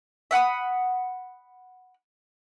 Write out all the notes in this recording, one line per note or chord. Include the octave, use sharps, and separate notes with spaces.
E5 F#5 B5 D#6